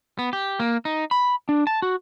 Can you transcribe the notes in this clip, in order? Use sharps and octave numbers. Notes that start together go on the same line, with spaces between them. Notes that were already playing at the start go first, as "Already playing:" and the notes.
B3
G4
A#3
D#4
B5
D4
A5
F#4